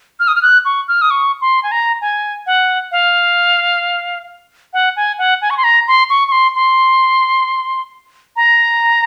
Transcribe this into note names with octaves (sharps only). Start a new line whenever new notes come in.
F6
D#6
F6
F#6
C#6
F6
D#6
C#6
C6
G#5
A#5
G#5
F#5
F5
F#5
G#5
F#5
G#5
C#6
C6
A#5
C6
C#6
C#6
C6
C6
A#5